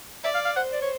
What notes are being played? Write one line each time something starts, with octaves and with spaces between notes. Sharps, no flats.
D5 E5
F5
F5
C5 F#5
D5
C#5